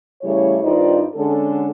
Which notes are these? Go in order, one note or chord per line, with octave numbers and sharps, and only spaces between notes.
C#3 E3 G3 A3 C#5
G2 D#3 D#4 F4 C5 D5
D3 G#3 C#4 A4